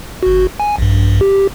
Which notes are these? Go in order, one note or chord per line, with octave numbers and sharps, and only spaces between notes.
G1 F#4
G#5
A#1 G2
G4